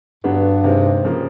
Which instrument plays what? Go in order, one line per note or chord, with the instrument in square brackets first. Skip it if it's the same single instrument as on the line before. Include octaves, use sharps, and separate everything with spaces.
[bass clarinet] G2 [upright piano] D3 F#3 B3 D4 G4
[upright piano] C3 D#3 G#3 C4
C#3 F3 A#3